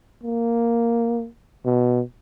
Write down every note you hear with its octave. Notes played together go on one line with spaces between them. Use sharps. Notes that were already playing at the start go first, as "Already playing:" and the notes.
A#3
B2